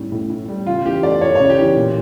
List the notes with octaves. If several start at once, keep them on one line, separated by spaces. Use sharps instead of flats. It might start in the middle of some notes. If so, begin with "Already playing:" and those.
Already playing: A2 G3 C#4
A2
A2
G3
C#3 F4
E3 G4
A3 D5
C#4 C#5
C#3 C#5
G4
E3
A#2